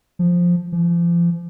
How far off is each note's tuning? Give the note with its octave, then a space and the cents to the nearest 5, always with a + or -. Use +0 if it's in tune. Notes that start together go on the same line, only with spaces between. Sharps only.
F3 +5
F3 -35